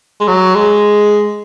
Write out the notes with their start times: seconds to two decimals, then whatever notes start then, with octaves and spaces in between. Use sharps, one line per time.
0.21 G#3
0.28 F#3
0.55 G#3